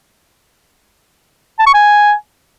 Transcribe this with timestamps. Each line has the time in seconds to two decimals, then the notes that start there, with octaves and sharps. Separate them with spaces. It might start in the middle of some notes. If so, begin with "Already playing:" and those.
1.59 A5
1.67 C#6
1.74 G#5